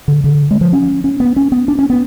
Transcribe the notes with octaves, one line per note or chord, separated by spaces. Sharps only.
D3
D3
G#3
F3
C#4
C#4
B3
C#4
B3
D4
C#4
B3